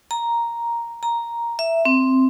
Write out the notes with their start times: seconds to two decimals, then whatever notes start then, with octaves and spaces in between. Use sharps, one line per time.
0.11 A#5
1.03 A#5
1.59 E5
1.85 C4